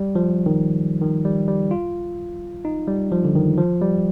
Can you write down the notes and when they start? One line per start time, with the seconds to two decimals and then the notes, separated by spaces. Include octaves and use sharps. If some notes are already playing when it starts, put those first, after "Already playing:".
Already playing: G3
0.15 F3
0.46 D#3
1.02 D#3
1.25 G3
1.48 G3
1.71 F4
2.65 D#4
2.88 G3
3.12 F3
3.24 D3
3.36 D#3
3.58 F3
3.82 G3